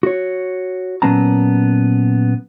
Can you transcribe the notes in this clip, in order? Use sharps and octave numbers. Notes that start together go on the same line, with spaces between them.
F#4 C#5
A#2 F#3 B3 C#4 A5 A#5